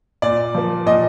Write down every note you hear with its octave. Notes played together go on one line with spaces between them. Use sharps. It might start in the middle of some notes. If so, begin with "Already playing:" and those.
A#2 D5
F3 A#3
A#2 D#5